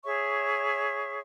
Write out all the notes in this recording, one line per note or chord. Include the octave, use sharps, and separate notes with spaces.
G#4 C#5 E5 C#6